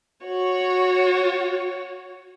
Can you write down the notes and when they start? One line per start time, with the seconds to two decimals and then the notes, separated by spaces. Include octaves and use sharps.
0.25 F#4 C#5